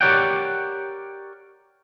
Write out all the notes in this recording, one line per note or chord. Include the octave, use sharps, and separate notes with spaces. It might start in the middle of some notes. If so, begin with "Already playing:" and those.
G4 A#4 C#5 D5 F#5 G5